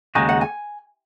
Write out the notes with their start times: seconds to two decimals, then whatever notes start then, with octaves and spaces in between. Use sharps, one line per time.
0.15 D#2 C#3 G#3 D#4 F#4 G#5
0.29 F#5
0.41 G#5